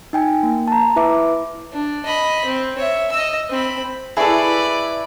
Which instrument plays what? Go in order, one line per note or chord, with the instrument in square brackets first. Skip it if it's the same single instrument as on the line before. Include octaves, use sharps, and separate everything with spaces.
[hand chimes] D#4 G5 G#5
A#3
A5 A#5
E4 B4 E5 D6
[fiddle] D4
D#5 B5
C4
C#5 E5
D#5 E6
C4 B5
[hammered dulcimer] E4 E5 C#6 [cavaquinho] G#4 A4 [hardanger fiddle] B4 D5